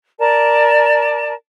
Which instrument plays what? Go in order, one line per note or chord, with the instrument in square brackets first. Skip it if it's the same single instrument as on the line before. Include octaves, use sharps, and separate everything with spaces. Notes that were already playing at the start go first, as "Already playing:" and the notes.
[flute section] A#4 D5 A5